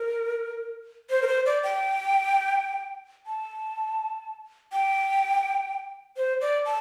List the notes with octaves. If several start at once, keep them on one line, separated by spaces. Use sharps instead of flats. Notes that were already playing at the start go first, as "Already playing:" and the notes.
Already playing: A#4
C5
A#4
C5
D5
G5
A5
G5
C5
D5
A5